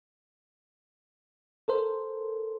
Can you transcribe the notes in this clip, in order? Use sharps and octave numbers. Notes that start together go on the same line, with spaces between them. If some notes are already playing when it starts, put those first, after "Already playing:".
A4 A#4 C5